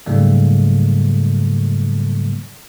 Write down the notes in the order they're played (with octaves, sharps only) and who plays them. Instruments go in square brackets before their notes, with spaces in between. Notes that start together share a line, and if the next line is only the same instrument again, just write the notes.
[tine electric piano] G#2 C#3 F#3 G3 A3 A#3